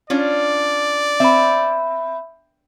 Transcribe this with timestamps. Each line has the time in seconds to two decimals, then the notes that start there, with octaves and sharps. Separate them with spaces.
0.10 C#4 D4 F4 D5
1.20 C4 E5 B5